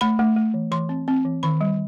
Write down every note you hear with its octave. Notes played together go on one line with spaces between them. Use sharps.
A3 B5
A3
A3
E3
E3 C6
C4
C4
E3
D#3 B5
G3